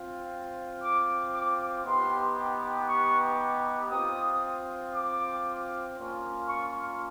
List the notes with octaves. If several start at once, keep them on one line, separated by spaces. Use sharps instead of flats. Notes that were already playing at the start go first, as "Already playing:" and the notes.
Already playing: C4 F4
D6
D6
B3 D#4 G4 C6
C#6
C4 F4 D#6
D6
A#3 C#4 F4
C#6